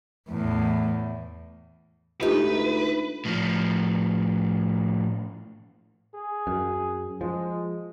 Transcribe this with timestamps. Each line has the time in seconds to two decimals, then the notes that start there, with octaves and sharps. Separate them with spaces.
0.29 E2 A2
2.21 D2 G#3 D#4 F4 G4 B4
3.25 A2 F3
6.14 G#4
6.47 F#2
7.21 F3 G#3